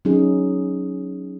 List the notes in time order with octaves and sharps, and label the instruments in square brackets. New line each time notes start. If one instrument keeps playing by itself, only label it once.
[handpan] F#3 C#4 D#4 G#4